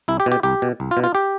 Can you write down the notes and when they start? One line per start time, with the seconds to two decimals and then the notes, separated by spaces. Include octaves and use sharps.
0.08 C2 E4
0.20 G4
0.26 B2
0.32 G4
0.43 C2 G4
0.62 B2
0.80 C2
0.91 F4
0.97 B2
1.04 F4
1.15 G4